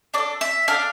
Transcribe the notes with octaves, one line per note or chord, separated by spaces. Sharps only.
D4 A4 D5
E5
D4 A4 F5